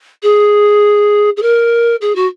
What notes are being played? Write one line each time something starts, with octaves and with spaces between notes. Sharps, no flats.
G#4
G#4
A#4
G#4
F#4